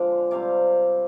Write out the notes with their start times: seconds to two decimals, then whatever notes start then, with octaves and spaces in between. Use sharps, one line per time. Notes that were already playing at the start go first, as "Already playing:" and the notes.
Already playing: D3 F3 G#3 D4 D5 F5
0.31 C3 G3 C4 D5 F5